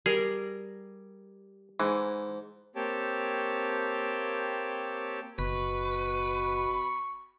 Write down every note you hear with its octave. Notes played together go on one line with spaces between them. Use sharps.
G3 G#4 A#4
G#2 E3
A#3 C4 G4 C#5 G5 A5
F#1 B2 B4 C#6